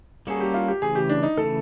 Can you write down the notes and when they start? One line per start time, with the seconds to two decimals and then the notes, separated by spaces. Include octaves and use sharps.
0.27 G3 A#3 C#4 F#4 G#4 A4
0.41 G4
0.54 F4
0.68 G4
0.82 C#3 E3 A3 G#4
0.95 G4
1.09 D4
1.23 D#4
1.37 C#3 E3 A3 A4